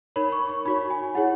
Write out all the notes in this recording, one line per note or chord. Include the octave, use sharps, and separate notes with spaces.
D#4 A#4 C#5 B5
C#6
C#6
D#4 F#4 C#5 B5
G#5
E4 G#4 C#5 F#5